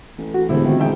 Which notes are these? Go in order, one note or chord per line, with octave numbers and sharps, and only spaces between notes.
A1
F#4
E1 A2 D3 E4 G4 C5
C3 D#3 F3
G#2 E5 G5